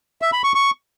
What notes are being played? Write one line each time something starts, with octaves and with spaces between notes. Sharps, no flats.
E5
B5
C#6
C#6